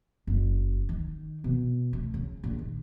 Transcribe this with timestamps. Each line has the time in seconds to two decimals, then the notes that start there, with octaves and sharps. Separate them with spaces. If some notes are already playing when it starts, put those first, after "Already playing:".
0.27 F#1
0.89 D#3
1.44 B2
1.93 A3
2.14 C#3
2.44 A#1
2.59 D#3